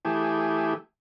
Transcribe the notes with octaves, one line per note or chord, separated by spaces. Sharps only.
E3 A3 G4 G#4